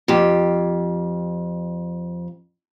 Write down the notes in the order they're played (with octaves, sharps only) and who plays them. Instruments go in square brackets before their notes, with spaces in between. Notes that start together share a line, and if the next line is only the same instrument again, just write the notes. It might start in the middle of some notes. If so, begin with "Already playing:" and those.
[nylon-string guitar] F2 G4